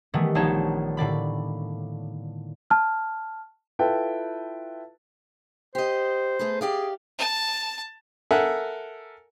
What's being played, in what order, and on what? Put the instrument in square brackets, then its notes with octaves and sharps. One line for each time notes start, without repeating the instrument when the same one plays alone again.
[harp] D#3 E3 G3 A3 B3
A#1 B3 D#4 C5 C#5 A5
A2 D3 D5 B5
[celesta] A5 F6
[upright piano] E4 F4 A4 B4 G5 A5
[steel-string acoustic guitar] G4 D#5 [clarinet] C5
[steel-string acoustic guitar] A3 G#4 B4
[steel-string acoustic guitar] G4 D5 F5 [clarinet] G#4
[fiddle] A5
[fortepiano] A4 A#4 E5 F#5 G#5